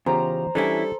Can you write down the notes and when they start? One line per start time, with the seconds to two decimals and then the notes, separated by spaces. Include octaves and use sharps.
0.06 E2 C#3 F4 G4 C5 A#5
0.55 E3 G3 C#4 D4 E4 A4